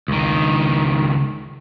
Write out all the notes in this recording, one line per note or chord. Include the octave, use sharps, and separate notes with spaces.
C#2 D#3